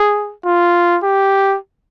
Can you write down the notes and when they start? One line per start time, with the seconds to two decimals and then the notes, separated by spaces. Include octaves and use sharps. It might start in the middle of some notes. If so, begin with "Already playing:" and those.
Already playing: G#4
0.45 F4
1.03 G4